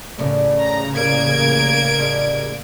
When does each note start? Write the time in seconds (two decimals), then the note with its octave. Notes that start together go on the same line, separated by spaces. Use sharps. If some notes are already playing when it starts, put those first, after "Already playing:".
0.19 A1 C#3 A3 A#4 D5
0.61 A#5
0.95 E3 G3 A#3 G#6 D7
1.98 F3 G3 G#3